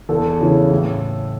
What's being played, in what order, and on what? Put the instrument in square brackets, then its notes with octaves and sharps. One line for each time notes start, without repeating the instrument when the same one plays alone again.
[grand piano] E2 A4
C#3 E3
A2